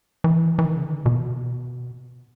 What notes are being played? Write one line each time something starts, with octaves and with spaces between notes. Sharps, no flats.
E3
E3
D#3
C#3
D3
B2